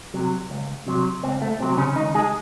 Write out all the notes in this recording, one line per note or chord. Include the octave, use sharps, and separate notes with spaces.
C3 F#3
C#2
C3 F#3
C#2 C4
A3
C3 F#3 C4
C#3 C#4
C#2 D#3 D#4
G#3 G#4